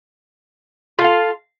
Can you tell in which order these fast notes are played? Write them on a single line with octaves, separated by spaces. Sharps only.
F4 A4 F5